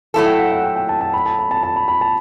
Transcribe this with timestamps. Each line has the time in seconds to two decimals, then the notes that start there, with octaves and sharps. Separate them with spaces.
0.14 F#3 A3 E4 A4 A5
0.26 G5
0.39 F#5
0.52 F#5
0.63 G5
0.76 G5
0.89 A5
1.01 A5
1.14 B5
1.26 A5
1.39 B5
1.51 A5
1.63 A5
1.76 B5
1.88 B5
2.01 A5